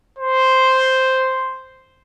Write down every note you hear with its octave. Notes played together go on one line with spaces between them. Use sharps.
C5